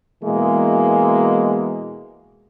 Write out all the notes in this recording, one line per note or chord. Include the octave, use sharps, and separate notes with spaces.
B2 E3 G#3 A#3 G#4